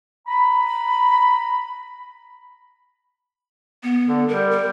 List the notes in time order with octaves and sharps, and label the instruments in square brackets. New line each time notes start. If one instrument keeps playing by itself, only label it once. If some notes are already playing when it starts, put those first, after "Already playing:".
[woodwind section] A#5 B5
[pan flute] B3
[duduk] D3
[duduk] G3 [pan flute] A#4
[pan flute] A#4